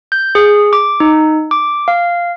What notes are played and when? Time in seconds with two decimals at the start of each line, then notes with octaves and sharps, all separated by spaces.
0.12 G6
0.35 G#4
0.73 D6
1.00 D#4
1.51 D6
1.88 F5